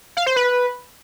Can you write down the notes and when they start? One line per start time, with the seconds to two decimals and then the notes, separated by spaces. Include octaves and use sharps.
0.17 F5
0.26 C5
0.36 B4